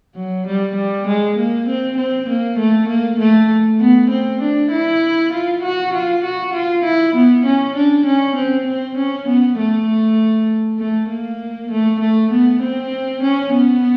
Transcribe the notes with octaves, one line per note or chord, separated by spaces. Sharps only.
F#3
G3
G3
G#3
A#3
C4
C4
A#3
A3
A#3
A3
B3
C4
D4
E4
F4
F#4
F4
F#4
F4
E4
B3
C#4
D4
C#4
C4
C4
C#4
B3
A3
A3
A#3
A3
A3
B3
C4
C#4
B3